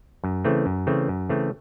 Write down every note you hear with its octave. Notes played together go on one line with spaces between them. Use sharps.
F#2
C#3 E3 A3 C4
F#2
C#3 E3 A3 C4
F#2
C#3 E3 A3 C4